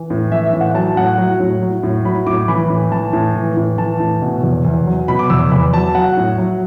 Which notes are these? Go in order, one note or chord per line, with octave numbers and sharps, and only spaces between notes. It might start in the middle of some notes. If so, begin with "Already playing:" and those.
Already playing: E3
A2
E3 E5
E5
A2
F#5
F#3 A5
A2 F#5
F#3
A2
F#3
A2
F#3 B5
A2 D6
E3 B5
A2
E3 A5
A2
E3
A2
E3 A5
A2
B2
E2
E2
F#3
B2 B5
D6
E2 E6
D6
E2 B5
F#3 A5
F#3 F#5
A2
F#3